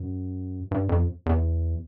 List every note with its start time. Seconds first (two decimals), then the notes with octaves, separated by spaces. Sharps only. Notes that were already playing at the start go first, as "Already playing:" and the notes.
Already playing: F#2
0.71 G2
0.89 F2
1.26 E2